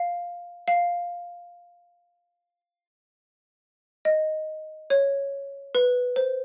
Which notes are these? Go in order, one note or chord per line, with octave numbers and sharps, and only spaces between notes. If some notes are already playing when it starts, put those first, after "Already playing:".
Already playing: F5
F5
D#5
C#5
B4
C5